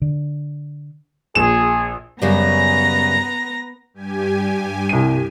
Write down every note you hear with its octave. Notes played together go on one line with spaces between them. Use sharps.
D3
A#1 G#4 E7
F#2 C#3 G3 B3 A#5 A#6
G2 G4 G#5
C2 D#7